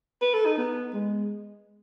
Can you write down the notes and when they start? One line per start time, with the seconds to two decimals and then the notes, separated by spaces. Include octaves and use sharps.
0.22 B4
0.34 A4
0.46 D#4
0.58 B3
0.94 G#3